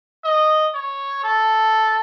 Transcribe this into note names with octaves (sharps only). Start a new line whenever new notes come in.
D#5
C#5
A4